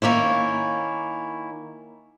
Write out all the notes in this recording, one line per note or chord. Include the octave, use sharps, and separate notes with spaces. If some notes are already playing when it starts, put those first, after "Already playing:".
D#3 A#3 C#4 E4